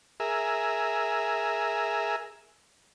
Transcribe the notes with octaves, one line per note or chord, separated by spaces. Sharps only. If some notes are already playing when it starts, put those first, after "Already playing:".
G#4 A#4 E5